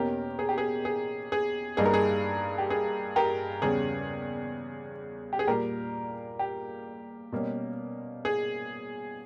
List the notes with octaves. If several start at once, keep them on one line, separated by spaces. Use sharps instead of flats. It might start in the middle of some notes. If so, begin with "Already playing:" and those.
Already playing: E2 B2 A#3 C#4 G4 A#4
G#4
G4
G#4
G#4
G#4
G2 G3 A#3 D#4 G#4
A#4
G#4
G4
G#4
G4 A#4
E2 C#3 G3 C#4 G#4
G4
G#4
A#2 G3 A#3 G4 A#4
G4
B2 G3 A#3 C#4
G#4